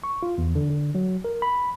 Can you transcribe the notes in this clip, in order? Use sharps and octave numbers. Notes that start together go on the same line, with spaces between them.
C#6
F4
E2
D3
D3
F#3
A#4
B5